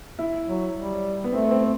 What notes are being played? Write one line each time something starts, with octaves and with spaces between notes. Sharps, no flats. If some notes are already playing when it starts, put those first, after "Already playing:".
E4
F#3
G3
B3
A3 C4
C4